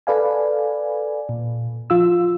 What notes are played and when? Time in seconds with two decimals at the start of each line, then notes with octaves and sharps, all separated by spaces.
0.07 A4 B4 D5 F5 G#5
1.29 A#2
1.90 F3 F4 E6